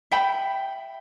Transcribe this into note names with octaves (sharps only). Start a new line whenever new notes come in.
E5 G5 B5